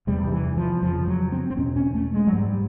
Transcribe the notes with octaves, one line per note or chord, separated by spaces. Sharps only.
E2 C3 G3
D#3
E3
F3
F2 C#3 F3
F#3
C4
C4
E2 B2 C#4
C#4
A3
G#3
F#3
G#2 G3